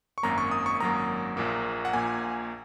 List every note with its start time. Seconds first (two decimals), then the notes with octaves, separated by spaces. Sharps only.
0.18 C#6
0.23 G#1 F#2 F#3 A#3 A#5
0.38 C#6
0.51 D#6
0.66 C#6
0.80 G#1 F#2 F#3 A#3 A#5
1.37 A#1 A#2 A#3
1.85 F#5
1.93 A#1 A#2 A#3 G#5